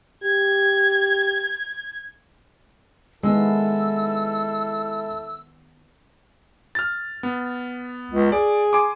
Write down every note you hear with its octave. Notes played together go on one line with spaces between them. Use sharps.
G4 G#6
D#3 G#3 B3 E4 A4 E6
F6 A6
B3
C#2
G#4 D5
G#5 C6 D6